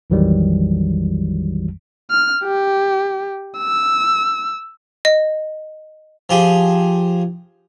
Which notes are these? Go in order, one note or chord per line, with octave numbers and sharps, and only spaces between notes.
A#1 F2 D#3 E3 F#3 G3
F6
G4
E6
D#5
F3 G4 G#4